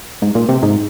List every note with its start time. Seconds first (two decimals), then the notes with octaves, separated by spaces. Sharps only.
0.22 G#2
0.35 A#2
0.49 C3
0.62 G#2